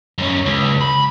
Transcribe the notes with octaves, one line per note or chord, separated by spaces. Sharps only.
F#2 C#4
C#2
B5